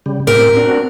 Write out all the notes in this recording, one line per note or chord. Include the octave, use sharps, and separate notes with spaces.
C#3 G3
A2 C4 G4 A#4
C4 D4 F#4